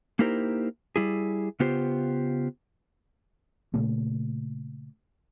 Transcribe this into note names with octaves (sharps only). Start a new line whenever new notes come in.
A#3 D#4 E4 G4 A#4 C5
G3 E4 G#4
C#3 B3 F4 G4 C5
A#2 C#3 A3 A#3